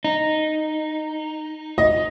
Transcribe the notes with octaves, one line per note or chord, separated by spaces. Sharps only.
D#4
D#5